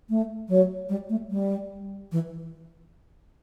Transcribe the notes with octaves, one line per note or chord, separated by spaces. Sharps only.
A3
F#3
G3
A3
G3
E3